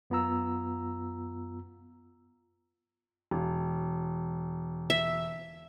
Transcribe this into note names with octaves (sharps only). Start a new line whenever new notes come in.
F#2 B3 F4 A#5 E6
E1
E5